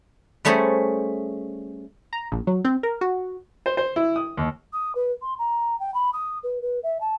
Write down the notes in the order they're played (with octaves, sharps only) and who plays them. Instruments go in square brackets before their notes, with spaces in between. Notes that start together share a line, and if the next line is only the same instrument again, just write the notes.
[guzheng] G3 A3 C#4 G#4 C5
[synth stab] A#5
A#1
F#3
C4
A#4
F#4
[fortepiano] C5
C5
E4
D#6
D#2
[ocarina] D#6
B4
C6
A#5
G5
B5
D#6
B4
B4
E5
A5